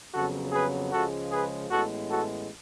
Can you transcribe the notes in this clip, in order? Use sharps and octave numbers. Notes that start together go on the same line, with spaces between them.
F2 C#3 F#3 B3 F#4 A4
G#4 B4
C#2 C#3 F3 G#3 F#4 A4
G#4 B4
A1 A2 G#3 B3 F#4 A4
F#4 A4